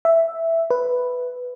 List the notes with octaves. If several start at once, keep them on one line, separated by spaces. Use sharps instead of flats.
E5
B4